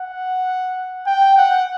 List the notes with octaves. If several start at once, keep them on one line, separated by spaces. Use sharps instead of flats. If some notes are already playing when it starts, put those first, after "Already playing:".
Already playing: F#5
G5
F#5